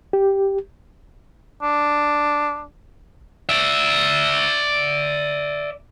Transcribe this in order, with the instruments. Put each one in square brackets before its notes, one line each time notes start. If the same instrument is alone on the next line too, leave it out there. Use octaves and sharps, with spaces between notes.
[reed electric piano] G4
[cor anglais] D4
[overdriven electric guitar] D5 E5